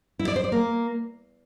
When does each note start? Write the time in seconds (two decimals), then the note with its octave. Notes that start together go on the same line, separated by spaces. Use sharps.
0.19 E4
0.28 D5
0.36 C5
0.44 D5
0.52 A#3